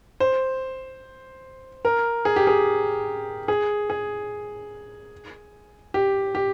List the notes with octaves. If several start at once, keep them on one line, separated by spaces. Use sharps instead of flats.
C5
A#4
G#4
G4
G#4
G#4
G#4
G4
G4